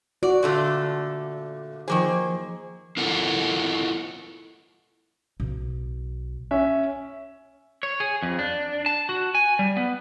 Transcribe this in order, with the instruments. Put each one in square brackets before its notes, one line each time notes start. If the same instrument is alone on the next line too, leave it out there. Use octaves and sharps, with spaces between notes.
[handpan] F#4 [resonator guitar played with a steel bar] D5
[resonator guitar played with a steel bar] A#2 D3 A3
[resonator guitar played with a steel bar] D#3 A#3 G#4 [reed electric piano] F3 C5
[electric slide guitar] E4 F4 A4 A#4 F#5 G#5
[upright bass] B1
[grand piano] C#4 E5
[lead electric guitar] C#5
G#4
F2
D4
A5
F#4
G#5
G3
B3